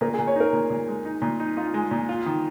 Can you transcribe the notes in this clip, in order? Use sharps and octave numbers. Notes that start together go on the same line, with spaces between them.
A#2 A#4
G#4
A#2
C#5
D#4 A#4
A#2
A#2
G#3
D#4
A#2
D#4
D#4 F4
G#3
A#2
F4
D#3